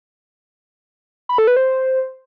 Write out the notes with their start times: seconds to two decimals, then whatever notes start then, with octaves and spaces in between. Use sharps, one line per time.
1.29 B5
1.38 A4
1.47 B4
1.57 C5